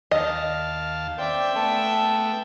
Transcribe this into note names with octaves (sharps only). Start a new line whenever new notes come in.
D#2 D#5 F5 A5
C5 D5 E5 G5
A3 B3 A5